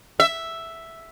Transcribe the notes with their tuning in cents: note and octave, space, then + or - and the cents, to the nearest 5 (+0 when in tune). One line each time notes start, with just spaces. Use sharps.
E5 +0